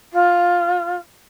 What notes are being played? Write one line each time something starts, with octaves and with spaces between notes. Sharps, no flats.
F4